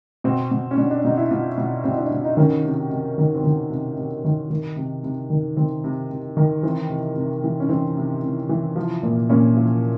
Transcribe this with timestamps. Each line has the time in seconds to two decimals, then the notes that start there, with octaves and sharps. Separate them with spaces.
0.24 B2 C4
0.51 B2
0.71 C#4
0.78 B2 D4
0.91 D4
1.04 B2 D#4
1.17 E4
1.31 B2 F4
1.58 B2
1.84 B2 C4
1.98 D4
2.11 B2
2.24 D#4
2.37 D#3 C#4
2.65 C3
2.91 C3
3.18 D#3
3.35 C4
3.43 D#3 B3
3.71 C3
3.97 C3
4.24 D#3
4.50 D#3
4.76 C3
5.03 C3
5.30 D#3
5.57 D#3 C4
5.84 C3
6.10 C3
6.37 D#3
6.63 E3 C4
6.89 C3
7.16 C3
7.44 E3
7.60 C#4
7.69 E3 C4
7.97 C3
8.23 C3
8.49 E3
8.76 F3
9.03 A#2
9.30 A#2 C#4
9.57 F3